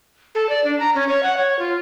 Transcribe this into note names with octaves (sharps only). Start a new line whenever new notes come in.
A4
D5
D4
A#5
C#4
C#5
F#5
C#5
F4